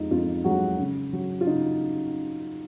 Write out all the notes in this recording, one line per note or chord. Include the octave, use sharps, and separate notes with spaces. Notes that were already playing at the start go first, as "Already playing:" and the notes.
Already playing: F2 G#3 D#4 F4
F2 F4
F#3 G#3 F#4
C#3
F#3
F4
C#3 D#4